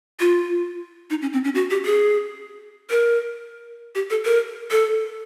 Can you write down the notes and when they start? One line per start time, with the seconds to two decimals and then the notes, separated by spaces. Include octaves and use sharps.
0.20 F4
1.10 D#4
1.22 C#4
1.33 C4
1.44 C#4
1.55 F#4
1.70 G4
1.85 G#4
2.90 A#4
3.95 G4
4.10 A4
4.25 A#4
4.71 A4